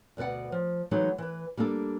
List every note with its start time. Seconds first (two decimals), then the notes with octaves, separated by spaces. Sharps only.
0.17 D2 B2 B4 D5 F#5
0.52 F3
0.91 E3 F#3 G#3 D#4 A4
1.18 E3 B4
1.57 G3 A#3 D4 A4